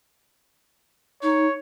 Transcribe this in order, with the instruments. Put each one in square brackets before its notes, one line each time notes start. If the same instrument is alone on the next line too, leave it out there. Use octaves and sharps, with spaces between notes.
[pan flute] D#4 [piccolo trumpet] C#5